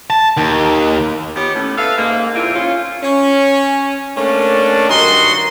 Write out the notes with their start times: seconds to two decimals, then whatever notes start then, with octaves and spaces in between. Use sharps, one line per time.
0.10 A5
0.37 D#2
1.36 B3 F4 G4 C#5
1.55 A2 C#4
1.77 A4 B4 E5 F5
1.98 G#2 A#3
2.35 F2 A#2 A#3 C4 E4 F4
2.54 C#4 F4
3.02 C#4
4.16 A3 A#3 C#4 D4
4.88 G2 D#3 D#4 F#4 C6